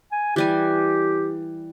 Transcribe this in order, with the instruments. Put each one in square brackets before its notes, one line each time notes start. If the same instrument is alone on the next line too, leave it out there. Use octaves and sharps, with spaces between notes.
[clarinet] G#5
[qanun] E3 G3 G#5 [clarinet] G4